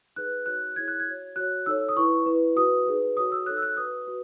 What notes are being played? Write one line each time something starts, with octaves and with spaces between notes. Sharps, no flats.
D#4 G#4 B4 F#6
D#4 F#4 C#5 F#6
E4 G#4 C#5 G#6
F#6
G#6
F#4 C#5
F#4 C#5 F#6
D#4 A4 C#5 E6
D#6
E4 B4 C#6
E4 B4
F#4 B4 D#6
D#4 G#4 B4
F#4 A4 C#5 D#6
E6
D#4 A4 C#5 F#6
E6
F#6
F#4 B4 D#6
F#4 B4